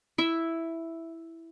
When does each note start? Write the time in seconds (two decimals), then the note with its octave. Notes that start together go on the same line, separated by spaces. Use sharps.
0.18 E4 E5